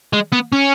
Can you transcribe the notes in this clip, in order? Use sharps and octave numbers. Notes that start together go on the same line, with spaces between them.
G#3
B3
C#4